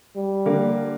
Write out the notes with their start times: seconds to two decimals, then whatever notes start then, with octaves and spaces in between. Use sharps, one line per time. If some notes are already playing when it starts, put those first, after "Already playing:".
0.16 G3
0.46 D3 A#3